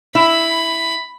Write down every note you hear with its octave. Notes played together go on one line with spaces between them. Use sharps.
E4 B5